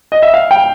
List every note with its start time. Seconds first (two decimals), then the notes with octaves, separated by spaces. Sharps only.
0.12 D#5
0.23 E5
0.34 F5
0.51 G5